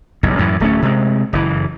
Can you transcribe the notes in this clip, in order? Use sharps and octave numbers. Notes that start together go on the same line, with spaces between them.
F#1 B1 G2
F#2 A2 E3
D1 A3 C#4
C3 G#3
F#1 E3